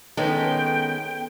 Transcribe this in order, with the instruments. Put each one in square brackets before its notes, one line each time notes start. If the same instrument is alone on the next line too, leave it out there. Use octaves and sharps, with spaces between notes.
[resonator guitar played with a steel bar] D#3 G#3 [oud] B3 C#4 A4 [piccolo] G5